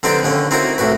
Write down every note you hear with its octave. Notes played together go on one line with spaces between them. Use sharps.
D3 C4 D#4 G4 B4 D5
D#2 D3 C#4
C4 D#4 E4 F#4 A#4
C2 A2 F#4 B4